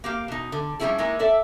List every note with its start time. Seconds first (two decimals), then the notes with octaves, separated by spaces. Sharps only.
0.04 A#3 G4 F5
0.28 B2 D#4
0.52 D3
0.79 F3 G3 A3 C#4 E4 G#4
0.98 G#3 A#3 D#4 E4
1.19 A4 D5 E5